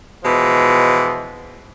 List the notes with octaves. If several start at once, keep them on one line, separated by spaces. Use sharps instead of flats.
B2 E3 F3 G#3